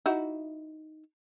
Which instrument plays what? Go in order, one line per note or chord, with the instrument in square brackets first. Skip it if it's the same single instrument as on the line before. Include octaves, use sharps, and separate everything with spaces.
[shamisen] D#4 E4 F#4